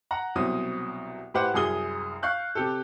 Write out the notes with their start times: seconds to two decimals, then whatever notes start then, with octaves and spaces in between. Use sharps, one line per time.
0.11 F#5 A#5
0.35 C2 B2 F#3 C4 D#6
1.34 A2 G4 B4 C5 F#5 D6
1.54 C2 F#2 G#4 D#6 G7
2.23 F5 C#6 F#6 G6
2.55 C3 G4 A4